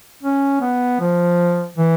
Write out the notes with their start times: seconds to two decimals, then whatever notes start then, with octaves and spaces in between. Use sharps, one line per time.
0.23 C#4
0.61 B3
1.00 F3
1.76 E3